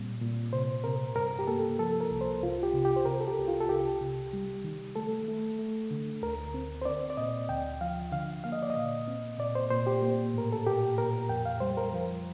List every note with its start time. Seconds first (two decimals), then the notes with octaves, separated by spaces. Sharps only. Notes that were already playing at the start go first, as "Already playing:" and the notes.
Already playing: A#2 G3 C4
0.21 A#2
0.53 C3 C5
0.84 C3 A#4
1.15 G2 A#4
1.39 G4
1.47 A#3 A4
1.79 F3 A4
2.01 A#4
2.11 C2
2.21 C5
2.42 C2 F4
2.63 G4
2.74 C3
2.85 G4
2.96 C5
3.05 C3 A#4
3.21 A4
3.27 G4
3.38 C2
3.48 F4
3.61 A4
3.69 C2 G4
4.01 C3
4.33 G3
4.64 D#3
4.96 A3 A4
5.28 A3
5.59 A3
5.91 D3
6.22 D2 A#4
6.54 C4
6.82 C5
6.85 C4 D5
7.10 D5
7.17 A#2 D#5
7.49 D2 G5
7.81 F3 F5
8.12 D3 F5
8.44 A#3 F5
8.52 D#5
8.62 D5
8.70 D#5
8.76 A#2
9.08 C4
9.39 A#2 D5
9.55 C5
9.71 A#2 C5
9.87 G4
10.02 A#3
10.34 A2 A#4
10.52 A4
10.67 A#2 G4
10.97 A#2 A#4
11.29 F2 G5
11.46 F5
11.60 G3 C5
11.77 A#4
11.93 F3